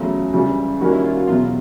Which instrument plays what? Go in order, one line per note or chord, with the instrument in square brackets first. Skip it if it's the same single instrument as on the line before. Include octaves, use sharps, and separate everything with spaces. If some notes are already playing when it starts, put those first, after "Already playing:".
Already playing: [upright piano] E2 C#3 F#3 A3 [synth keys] F4
[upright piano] C#2 C#3 E3 G3
[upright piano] D#3 G3 A#3 C#4 [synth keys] F#4
[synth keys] E4
F4
F#4
[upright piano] E2 B2 F#3 [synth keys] F4